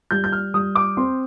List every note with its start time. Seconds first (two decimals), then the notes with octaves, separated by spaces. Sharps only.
0.11 G3 G6
0.24 G6
0.32 F6
0.54 G3 D#6
0.75 D6
0.97 C4 C6